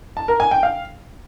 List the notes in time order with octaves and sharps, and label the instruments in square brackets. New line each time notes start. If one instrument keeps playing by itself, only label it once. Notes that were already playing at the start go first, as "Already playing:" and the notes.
[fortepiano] A5
A#4
G#5
G5
F5